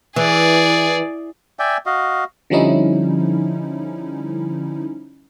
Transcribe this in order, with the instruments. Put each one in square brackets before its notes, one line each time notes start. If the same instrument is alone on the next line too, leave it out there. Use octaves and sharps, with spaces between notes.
[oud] E3 [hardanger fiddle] G#4 D5
[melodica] D5 E5 G5 G#5
F#4 D#5 F5
[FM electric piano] D3 F3 G3 C#4 D#4 E4